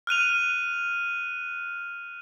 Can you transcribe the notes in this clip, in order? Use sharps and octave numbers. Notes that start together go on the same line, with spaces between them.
F6 F#6 D#7 F7